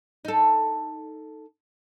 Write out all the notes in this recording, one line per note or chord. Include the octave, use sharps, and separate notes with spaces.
D#4 A4